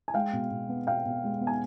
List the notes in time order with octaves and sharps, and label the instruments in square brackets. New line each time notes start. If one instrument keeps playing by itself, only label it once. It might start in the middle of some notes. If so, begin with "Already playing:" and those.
[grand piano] G#5
G#3 F5 G5
B2
B2
B3
B2 F5 G5
B2
G#3
B3
G#5